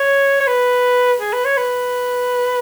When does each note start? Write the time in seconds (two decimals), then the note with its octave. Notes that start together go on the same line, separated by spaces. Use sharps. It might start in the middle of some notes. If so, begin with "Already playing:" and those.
Already playing: C#5
0.40 C#5
0.47 B4
1.20 G#4
1.33 B4
1.45 C#5
1.57 B4